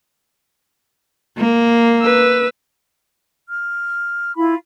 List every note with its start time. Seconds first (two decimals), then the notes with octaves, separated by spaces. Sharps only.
1.38 A#3
2.01 B4 E6
3.50 F6
4.37 E4 F4 F5 B5